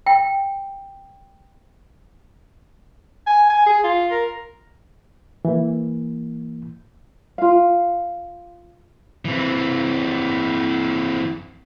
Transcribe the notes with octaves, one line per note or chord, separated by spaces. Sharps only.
G5
G#5
G#5
G#4
F4
A#4
E3 A#3
F4 F5
E3 C4